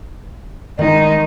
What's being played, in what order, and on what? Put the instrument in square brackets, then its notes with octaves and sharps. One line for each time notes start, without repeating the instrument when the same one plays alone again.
[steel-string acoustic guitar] D#3 [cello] G#3 D#4